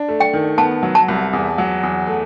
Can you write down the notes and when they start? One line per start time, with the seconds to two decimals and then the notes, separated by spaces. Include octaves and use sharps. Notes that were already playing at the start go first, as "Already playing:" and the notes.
Already playing: D4
0.09 A3
0.20 G5
0.33 D#3
0.58 B3 A5
0.83 F#3
0.95 A5
1.09 C2
1.33 E2
1.58 F#3
1.83 E2
2.07 A3